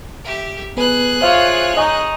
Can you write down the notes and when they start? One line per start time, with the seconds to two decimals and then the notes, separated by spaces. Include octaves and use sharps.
0.25 G4 E5
0.77 B3 G#4 B4 F#6
1.21 F4 C5 C#5 E5 F5
1.77 D#4 D#5 G#5 C#6